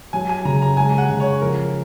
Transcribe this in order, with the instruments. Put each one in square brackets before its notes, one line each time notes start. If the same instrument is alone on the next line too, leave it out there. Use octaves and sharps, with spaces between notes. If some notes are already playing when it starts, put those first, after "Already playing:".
[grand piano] F#3 [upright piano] G#5
[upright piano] G#5
[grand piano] C#3 [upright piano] A#5
[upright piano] A#5
[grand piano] G#3 [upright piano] G#5
[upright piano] F#5
[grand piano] C#3
[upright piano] C#5
[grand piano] F3 [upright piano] A#4